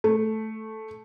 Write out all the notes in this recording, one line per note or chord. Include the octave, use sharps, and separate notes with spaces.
A3